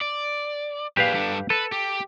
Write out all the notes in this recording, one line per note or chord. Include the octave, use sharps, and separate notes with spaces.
D5
A#2 D4 G4 G#4 B4 F5
G2 D4 A4
A4 B4
G4